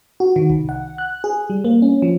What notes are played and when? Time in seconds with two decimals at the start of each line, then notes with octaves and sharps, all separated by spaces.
0.20 F#4
0.36 D#3
0.50 C2
0.69 F#5
0.98 F#6
1.24 G#4
1.50 G3
1.65 A#3
1.82 C#4
2.02 F3